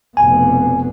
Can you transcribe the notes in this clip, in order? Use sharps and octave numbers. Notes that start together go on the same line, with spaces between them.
F1 B2 G#5